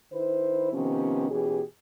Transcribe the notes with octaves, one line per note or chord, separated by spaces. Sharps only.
D#3 E4 B4 C5
C3 D#3 F3 B3 C#4
B2 E3 C#4 G4 G#4